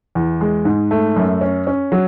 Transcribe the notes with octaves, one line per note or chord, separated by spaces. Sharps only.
E2
G#3
G#2
A3
F#2
C#4
C#4
F#3